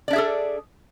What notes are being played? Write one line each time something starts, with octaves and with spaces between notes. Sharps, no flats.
D4 G#4 A4 D5 E5